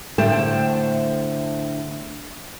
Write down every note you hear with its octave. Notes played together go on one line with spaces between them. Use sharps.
A2 D3 A3 C5 G5 A5